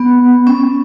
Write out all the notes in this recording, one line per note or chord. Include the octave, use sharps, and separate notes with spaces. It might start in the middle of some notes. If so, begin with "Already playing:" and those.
Already playing: B3
C#4